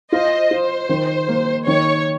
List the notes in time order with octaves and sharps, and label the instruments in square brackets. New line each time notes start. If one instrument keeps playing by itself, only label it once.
[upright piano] F4 [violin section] C5 D#5
[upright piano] F4 [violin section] C5
[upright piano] D#3
A#3
[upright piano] D#3 [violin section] C#5